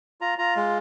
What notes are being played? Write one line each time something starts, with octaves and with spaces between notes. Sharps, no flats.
F4 A#5
F4 A#5
G#3